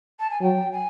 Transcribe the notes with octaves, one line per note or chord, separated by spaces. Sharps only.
A5
G#5
F#3 G5
G#5